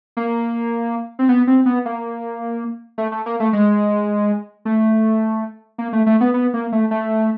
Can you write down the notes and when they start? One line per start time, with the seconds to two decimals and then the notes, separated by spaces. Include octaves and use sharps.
0.17 A#3
1.19 C4
1.29 B3
1.47 C4
1.66 B3
1.86 A#3
2.98 A3
3.12 A3
3.26 A#3
3.40 A3
3.53 G#3
4.65 A3
5.78 A#3
5.93 A3
6.07 A3
6.21 B3
6.34 B3
6.54 A#3
6.72 A3
6.91 A3